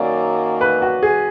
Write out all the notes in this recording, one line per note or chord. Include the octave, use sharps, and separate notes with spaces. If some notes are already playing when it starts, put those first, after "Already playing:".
Already playing: F#2 D#3 F#3 A#3 D5
B4
F#4
G#4